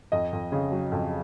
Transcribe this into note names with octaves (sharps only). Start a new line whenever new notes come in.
F2 D#5
F2
C#3
F#3
F2